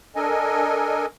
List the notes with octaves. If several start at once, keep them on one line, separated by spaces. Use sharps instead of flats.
D4 A4 A#4 D#5 G#5